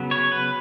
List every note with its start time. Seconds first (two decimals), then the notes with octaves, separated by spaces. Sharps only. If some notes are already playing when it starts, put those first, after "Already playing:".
Already playing: C#3 F#3 B3
0.11 C#5
0.32 B4